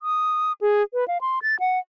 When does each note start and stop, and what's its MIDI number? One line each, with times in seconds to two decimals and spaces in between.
0.02 0.52 87
0.61 0.83 68
0.94 1.07 71
1.08 1.18 77
1.21 1.39 84
1.42 1.58 93
1.60 1.79 78